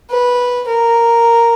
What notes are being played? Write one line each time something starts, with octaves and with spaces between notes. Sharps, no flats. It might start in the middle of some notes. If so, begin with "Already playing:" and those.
B4
A#4